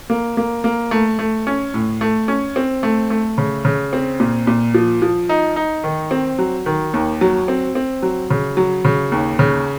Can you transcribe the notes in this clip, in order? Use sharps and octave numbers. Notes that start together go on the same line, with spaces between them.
A#3
A#3
A#3
A3
A3
C#4
A2
A3
C#4
C4
A3
A3
C#3
C#3
C4
A#2
A#2
F3
F3
D#4
D#4
D#3
C4
F#3
D#3
D#2
F#3
C4
C4
F#3
C#3
F#3
C#3
D#2
C#3